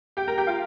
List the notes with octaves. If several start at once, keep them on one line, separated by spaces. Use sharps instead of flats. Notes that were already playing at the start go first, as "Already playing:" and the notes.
G4 G5
A#4 A#5
G4 G5
F4 F5